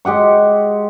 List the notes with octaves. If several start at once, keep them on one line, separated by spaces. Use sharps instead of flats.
G#3 G4 F#5 C#6